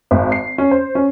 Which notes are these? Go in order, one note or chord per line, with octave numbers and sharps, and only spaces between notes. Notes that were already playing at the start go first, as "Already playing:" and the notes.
G#1
C7
C#4
C5
C#4